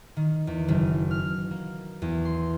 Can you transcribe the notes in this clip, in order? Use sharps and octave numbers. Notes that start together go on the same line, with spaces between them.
D#3
E2
F#1
F6
A#3
E2
C6